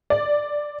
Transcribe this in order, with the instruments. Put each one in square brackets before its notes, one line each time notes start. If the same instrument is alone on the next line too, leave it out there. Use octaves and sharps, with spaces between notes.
[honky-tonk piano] D5